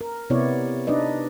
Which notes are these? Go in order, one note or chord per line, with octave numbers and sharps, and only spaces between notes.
A#4
C3 B3 E4 C#5 D5
D4 D#4 B4 D5 D#5